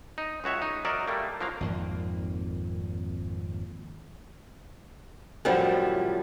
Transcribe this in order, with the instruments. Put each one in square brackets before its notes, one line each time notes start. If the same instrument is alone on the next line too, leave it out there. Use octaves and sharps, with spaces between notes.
[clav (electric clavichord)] D#4
C#2 F#4 C#5 E5
D#4
F#3 D#4 A#4 D5 E5
G3 A3 A#3
F3 F#3 A#3 F5
[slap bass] G#1 F2 A#3
[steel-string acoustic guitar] F#2 A2 D3 F3 G3 E4